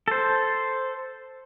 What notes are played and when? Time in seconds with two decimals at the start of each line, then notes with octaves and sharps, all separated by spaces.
0.08 A4 C5